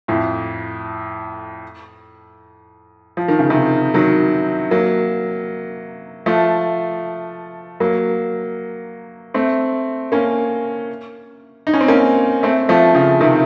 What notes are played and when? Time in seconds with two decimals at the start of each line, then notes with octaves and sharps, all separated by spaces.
0.08 F2 A2
3.17 F3
3.28 D#3
3.39 C#3
3.50 C3 D#3
3.94 D#3 F#3
4.71 F#3 A#3
6.26 F3 A3
7.80 F#3 A#3
9.34 A3 C4
10.12 A#3 C#4
11.67 D#4
11.74 C#4
11.81 C4
11.88 A#3 C#4
12.43 A3 C4
12.69 F3 A3
12.95 C#3 F3
13.20 C3 D#3